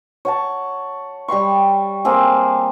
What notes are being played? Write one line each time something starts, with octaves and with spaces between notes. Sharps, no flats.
C#5 F#5 A5
G3 G5 C6 C#6
A#3 C4 G#4